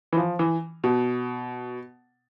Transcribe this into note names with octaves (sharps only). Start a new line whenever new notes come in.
E3
F3
E3
B2